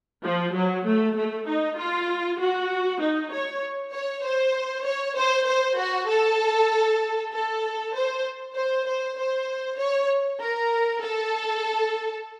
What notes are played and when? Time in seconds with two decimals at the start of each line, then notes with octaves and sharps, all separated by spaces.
0.24 F3
0.55 F#3
0.85 A3
1.17 A3
1.48 D#4
1.78 F4
2.40 F#4
3.01 D#4
3.32 C#5
3.94 C#5
4.25 C5
4.86 C#5
5.17 C5
5.47 C5
5.78 F#4
6.10 A4
7.33 A4
7.95 C5
8.56 C5
8.86 C5
9.18 C5
9.79 C#5
10.41 A#4
11.02 A4